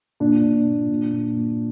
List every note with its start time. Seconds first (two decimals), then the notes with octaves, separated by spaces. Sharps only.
0.20 A#2 D4
0.44 A#2
0.66 A#2
0.90 A#2
1.13 A#2
1.36 A#2